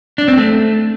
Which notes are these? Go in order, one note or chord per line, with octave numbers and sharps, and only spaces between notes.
D4
C4
A3